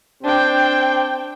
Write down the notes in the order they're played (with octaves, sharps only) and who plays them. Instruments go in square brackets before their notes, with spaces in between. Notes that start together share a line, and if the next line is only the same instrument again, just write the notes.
[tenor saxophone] C4 [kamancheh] D4 G5